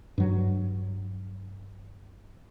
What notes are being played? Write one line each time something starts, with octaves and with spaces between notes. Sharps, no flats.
G2 F#3